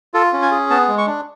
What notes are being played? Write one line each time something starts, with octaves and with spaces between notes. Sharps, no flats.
F4 A4
C#4
G#5
G#4
B3 A5
G#3
C#6
D4